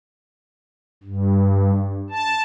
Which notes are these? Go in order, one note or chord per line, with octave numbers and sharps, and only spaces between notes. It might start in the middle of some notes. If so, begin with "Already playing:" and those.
G2
A5